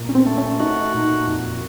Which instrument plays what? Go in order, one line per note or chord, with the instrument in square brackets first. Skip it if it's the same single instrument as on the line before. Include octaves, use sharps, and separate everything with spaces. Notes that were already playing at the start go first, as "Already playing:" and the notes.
Already playing: [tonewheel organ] A#2
[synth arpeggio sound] C#4
C4
[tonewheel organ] A3
[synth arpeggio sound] C#4
[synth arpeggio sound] D#4 [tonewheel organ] F#4
[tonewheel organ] A#2
F2